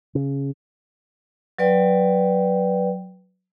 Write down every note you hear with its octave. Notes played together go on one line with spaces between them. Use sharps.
C#3
F#3 B4 D5 G5